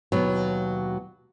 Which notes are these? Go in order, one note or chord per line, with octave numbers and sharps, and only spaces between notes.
D#2 B2 F#3